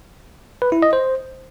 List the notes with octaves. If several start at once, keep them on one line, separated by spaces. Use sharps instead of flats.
B4
E4
D#5
C5